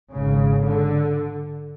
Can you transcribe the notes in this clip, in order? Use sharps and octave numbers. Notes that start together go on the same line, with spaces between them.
G#1 G#2 C#3
D3